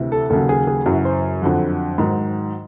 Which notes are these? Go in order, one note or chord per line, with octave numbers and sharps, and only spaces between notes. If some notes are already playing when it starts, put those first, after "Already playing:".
Already playing: D2 C3 E3
A4
D#2 C#3 F#3 A4
G#4
G#4
F#2 C#3 E3 F#4
C5
F2 D3 F#3
G#2 D#3 F#3